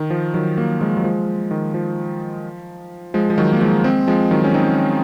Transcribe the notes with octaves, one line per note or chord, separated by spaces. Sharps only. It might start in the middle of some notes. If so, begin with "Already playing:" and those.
Already playing: D#3
F3
D#3 F#3
F#3 A#3
F3 G#3
F#3
F3 G#3
D#3
F3
F3 G#3
F3
D#3 F#3
A#3
F3 G#3
G#3 C4
F3 G#3
D#3 F#3
C#4
C4 D#4